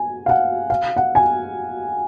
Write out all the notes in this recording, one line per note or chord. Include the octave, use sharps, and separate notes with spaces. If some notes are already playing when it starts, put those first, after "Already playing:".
Already playing: G#5
F5
F#5
F5
F#5
G#5